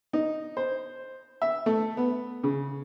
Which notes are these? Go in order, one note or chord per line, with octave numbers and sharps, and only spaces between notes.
D#4
C5
E5
A3
B3
C#3